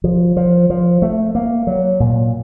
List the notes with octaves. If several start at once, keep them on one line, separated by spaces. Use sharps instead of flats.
F3
F3
F3
A3
A#3
F#3
A#2